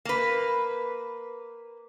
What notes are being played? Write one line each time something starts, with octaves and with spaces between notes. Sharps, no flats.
A#3 B4